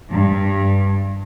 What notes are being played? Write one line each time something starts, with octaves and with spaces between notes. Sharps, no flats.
G2